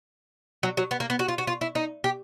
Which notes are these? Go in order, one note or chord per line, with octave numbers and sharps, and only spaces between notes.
F#3
F#3
B3
A#3
B3
F#4
F4
F#4
F4
E4
D#4
G4